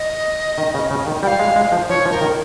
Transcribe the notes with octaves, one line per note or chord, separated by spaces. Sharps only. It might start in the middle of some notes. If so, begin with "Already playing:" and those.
Already playing: D#5
D#3
C#3
C#3
D#3
G3 G5
F5
G#3
G#3
F3
F3 C#5
F3
A#4
D#3